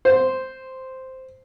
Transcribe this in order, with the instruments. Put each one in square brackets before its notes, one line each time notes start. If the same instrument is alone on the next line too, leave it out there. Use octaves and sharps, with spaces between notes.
[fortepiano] C5